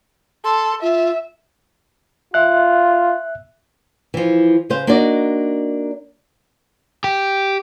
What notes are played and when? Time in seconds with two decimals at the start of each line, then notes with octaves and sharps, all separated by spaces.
0.45 A4 C6
0.82 F4 E5
2.34 F4 E5 F#6
4.14 E3 F3
4.70 C#3 B4 C5 F5
4.87 A#3 D4 D#4 F#4 D5
7.04 G4